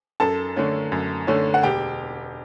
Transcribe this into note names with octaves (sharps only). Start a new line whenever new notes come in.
F#2 A4 A5
D3 A3 C#4
F#2
D3 A3 C#4
F#5
E1 G4 G5